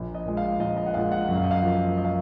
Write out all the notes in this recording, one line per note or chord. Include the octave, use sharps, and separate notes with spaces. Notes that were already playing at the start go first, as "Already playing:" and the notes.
Already playing: A#1
D#5
A#2 G#3
F5
A#1 D#5
D#5
F#5
A#2 G#3 F5
F#5
F#2 F#5
F5
D#5
F5
F3 A#3
D#5
F5